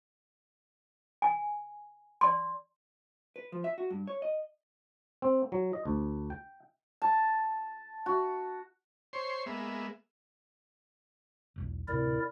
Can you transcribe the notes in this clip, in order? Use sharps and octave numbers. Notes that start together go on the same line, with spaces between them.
G#5
D5 C6
B4
F3
E5
F#4
G2
C#5
D#5
C4
F#3
D#5
D2
G5
A5
F#4
C5 C#5 C6
G#3 A#3 B3 E5
E1 B1 E2
D2 A2 C3 E4 A#4 D5